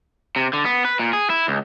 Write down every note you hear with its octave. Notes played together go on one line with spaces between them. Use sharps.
C3
D3
B3
B4
A#2
G#4
E4
C#2